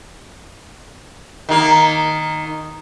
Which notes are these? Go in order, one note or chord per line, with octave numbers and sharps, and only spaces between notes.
D#3 A#3